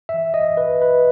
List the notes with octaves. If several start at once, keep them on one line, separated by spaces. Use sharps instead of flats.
G2 E3 E5
D#5
B4
B4